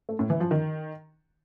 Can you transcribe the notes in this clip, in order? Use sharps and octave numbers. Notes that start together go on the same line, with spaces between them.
A3
A2
E3
F3
D#3